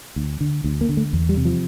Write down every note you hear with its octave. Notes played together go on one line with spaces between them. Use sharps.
D2
D3
D2
A#3
D3
A3
E2
G3
C3
F3